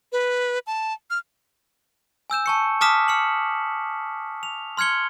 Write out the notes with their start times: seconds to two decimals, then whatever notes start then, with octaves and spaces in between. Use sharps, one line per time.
0.12 B4
0.67 A5
1.10 F6
2.30 G#5 E6 G6 E7
2.46 A5 C#6 C#7
2.81 A5 D6 D#6 F6 B6 E7
3.08 F6 C#7 F#7
4.43 F7
4.77 C6 F6 G#6 C#7 G7